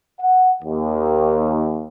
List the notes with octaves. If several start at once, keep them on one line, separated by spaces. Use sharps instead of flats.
F#5
D#2